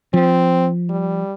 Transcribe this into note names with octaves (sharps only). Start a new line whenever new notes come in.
F3 C4
G3